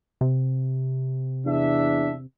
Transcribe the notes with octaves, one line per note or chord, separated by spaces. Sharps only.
C3
E2 D4 E5